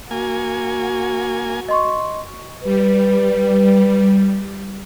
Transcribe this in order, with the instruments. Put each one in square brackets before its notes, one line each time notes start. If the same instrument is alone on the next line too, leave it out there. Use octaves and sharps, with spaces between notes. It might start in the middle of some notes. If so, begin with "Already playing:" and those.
[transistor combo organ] A#3 G#5 [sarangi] F#4
[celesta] D#5 C6 C#6
[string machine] G3 [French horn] B4